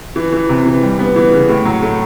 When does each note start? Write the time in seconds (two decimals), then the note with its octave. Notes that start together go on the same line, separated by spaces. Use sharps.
0.16 E3
0.32 E3
0.49 C3
0.66 E3
0.83 G3
0.99 B3
1.16 E3
1.32 C#3
1.49 A2
1.65 F#3
1.82 A3